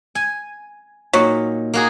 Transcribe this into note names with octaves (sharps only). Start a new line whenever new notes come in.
G#5
A#2 F#3 D#4
A#3 F#4 G#4